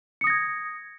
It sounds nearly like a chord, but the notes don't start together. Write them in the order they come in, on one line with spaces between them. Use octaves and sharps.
C#7 D#6 A#6 G#6